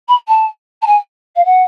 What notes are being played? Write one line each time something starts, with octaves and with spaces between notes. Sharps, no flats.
B5
A5
A5
G#5
F5
F#5